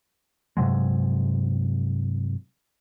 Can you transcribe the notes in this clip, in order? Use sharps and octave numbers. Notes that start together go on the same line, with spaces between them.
G2 C3 F#3 G#3